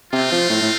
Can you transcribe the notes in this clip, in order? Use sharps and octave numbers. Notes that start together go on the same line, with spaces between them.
C3 A3 C4 F4
F3
A2
A2